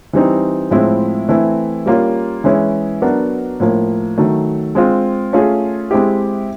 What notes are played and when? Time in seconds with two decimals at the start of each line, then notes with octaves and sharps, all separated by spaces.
0.13 E3 G3 C4 D#4
0.71 A2 F3 G#3 C4 E4
1.29 E3 A3 C4 E4
1.86 G3 A#3 C#4 F4
2.44 E3 G#3 C#4 E4
3.02 F#3 B3 D4 F#4 A#4
3.60 A2 F3 A#3
4.18 D#3 F#3 A3
4.75 G#3 C4 F4
5.33 A3 C#4 F4 G#4
5.91 G#3 C4 E4 G4